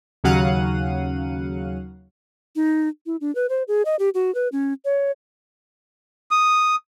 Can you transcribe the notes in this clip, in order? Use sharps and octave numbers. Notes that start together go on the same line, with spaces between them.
D#2 C#3 F#3 F5 F#5 D#7
D#4
E4
D4
B4
C5
G#4
D#5
G4
F#4
B4
C#4
C#5
D#6